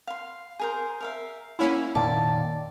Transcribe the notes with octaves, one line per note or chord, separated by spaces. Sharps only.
F5 C6
G#4 A#4 C5
A#4 E5 F5
A#3 C#4 E4 F5 F#5 B5
F1 A#2 D#3 D5 A5